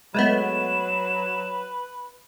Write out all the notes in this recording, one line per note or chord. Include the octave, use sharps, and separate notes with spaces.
F#3 G#3 A3 B3 B4 E7